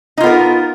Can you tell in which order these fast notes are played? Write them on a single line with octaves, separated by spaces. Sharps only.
D#4 F4 B3 A#4